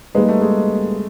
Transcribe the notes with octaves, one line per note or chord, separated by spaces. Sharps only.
G3 G#3 A#3 D#4 G#4 B4
A3
G#3